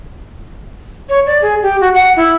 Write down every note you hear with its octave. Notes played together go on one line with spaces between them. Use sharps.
C#5
D5
G#4
G4
F#4
F#5
E4